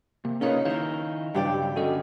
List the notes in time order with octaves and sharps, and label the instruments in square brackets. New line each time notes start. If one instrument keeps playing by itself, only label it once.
[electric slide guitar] C3 [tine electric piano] A#3
[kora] C#3 D#4 C#5 [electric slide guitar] C#4 F4 B4 [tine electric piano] A#4 F5
[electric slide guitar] D#3 D#4 E4 [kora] A#4 C5 [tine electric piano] F5
[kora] G2 G4 D5 [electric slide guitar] C#3 F#3 G3
[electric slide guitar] D3 G3 C#4 [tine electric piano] F#4 A4 D#5